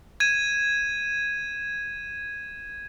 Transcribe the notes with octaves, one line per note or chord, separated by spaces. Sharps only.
G#6 D#7 E7